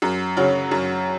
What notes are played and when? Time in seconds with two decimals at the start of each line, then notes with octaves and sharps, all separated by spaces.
0.02 F#2
0.37 C#3 F#3 C#4
0.71 F#2